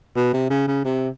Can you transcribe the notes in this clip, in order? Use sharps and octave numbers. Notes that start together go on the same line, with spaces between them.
B2
C3
C#3
C#3
C3